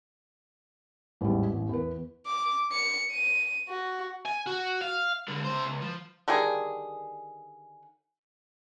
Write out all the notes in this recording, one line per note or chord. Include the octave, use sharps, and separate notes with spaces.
A1 E2 G#2 G3
A1
E2 B4
D6
C#7
D#7
F#4
G#5
F#4
F5
D3 G#3
C#3 C5
C#2
F3
D3 D#3 G3 G#4